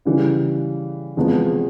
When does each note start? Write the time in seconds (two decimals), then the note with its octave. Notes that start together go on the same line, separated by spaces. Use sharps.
0.05 C#3 E3 G3
1.17 E2 C3 F3 G#3 B3